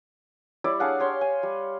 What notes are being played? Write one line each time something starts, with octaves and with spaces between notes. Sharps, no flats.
G3 E4 C#5 D5
D4 G#4 F5 F#5
G4 C#5 C6
G#5
G3